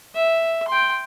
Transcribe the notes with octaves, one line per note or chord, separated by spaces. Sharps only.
E5
G5 C6